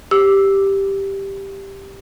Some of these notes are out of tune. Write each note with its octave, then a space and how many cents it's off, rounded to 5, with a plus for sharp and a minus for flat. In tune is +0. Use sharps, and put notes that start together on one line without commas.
G4 +0 E6 +0